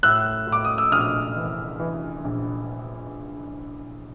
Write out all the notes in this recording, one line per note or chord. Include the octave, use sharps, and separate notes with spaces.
A2 E6 F#6
A2
D6
D#6
E6
A#1 D#6 F6
E3
E3
A#1